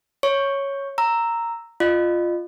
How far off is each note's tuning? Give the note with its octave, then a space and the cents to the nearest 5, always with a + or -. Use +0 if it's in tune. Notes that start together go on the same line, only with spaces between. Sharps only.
C#5 -5 C#6 +0
A#5 -10 E6 +0
F4 +0 D#5 -35